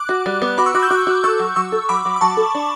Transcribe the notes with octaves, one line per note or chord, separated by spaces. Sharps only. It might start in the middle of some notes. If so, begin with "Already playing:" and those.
Already playing: D6 F#6
F#4
G3
B3
F#4 B5 D6
C#6 E6
F#4 D6 F#6
E6 G6
F#4 D6 F#6
F#4
A4 C#6 E6
F#3
F#3 C#6 E6
A4
F#3 B5 D6
F#3
D6
F#3 A5 C#6
A4
D4